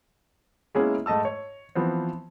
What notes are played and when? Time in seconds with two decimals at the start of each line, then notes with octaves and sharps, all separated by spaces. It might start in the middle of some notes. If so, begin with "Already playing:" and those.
0.75 G#3 A#3 B3 C#4 E4 G#4
1.06 G#2 A3 D#5 A5 E6
1.25 C#5
1.75 E3 F3 B3 C4